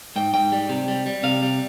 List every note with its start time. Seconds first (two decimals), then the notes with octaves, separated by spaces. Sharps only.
0.16 G#2 G5
0.34 G#2 G5
0.52 G3
0.69 C3
0.88 G3
1.06 G3
1.23 C3 F5
1.42 G3